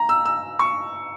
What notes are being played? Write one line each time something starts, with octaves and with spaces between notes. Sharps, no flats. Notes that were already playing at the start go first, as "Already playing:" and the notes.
Already playing: A#5
E6
E6
C#6